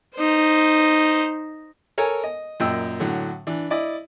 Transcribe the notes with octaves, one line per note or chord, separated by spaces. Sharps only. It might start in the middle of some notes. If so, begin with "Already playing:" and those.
D#4 C5
A4 A#4 C#5 G#5
D#5
F#2 A#2 D#5 G5 E6
A2 D3 F#3
E3 D4
E4 D5 D#5